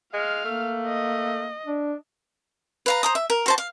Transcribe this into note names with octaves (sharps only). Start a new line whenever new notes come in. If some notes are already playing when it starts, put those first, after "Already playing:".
G#3 F5 F6
A3 A#3
D#5
D4
B4 F5 A#5
C5 A#5 D#6
E5
A#4
F#4 C5 A5
F5